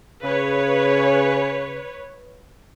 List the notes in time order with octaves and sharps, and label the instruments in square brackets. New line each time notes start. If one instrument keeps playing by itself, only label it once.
[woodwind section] C#3 [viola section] B4 C#5